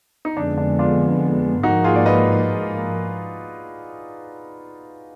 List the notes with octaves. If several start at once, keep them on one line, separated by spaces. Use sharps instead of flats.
D#4
F2 D3 G#3 B3 D4
D4
D4 F4
G#2 F3 A#3 D#4 F#4
F4 G#4
D5
B4 D#5